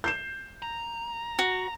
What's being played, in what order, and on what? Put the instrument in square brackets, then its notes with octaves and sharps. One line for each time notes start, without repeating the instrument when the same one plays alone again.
[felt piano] G6 C7 E7
[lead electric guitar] A#5
[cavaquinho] F#4